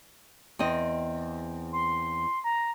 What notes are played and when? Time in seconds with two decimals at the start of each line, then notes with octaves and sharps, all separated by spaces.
0.59 E2 C4 D#5
1.73 C6
2.44 A#5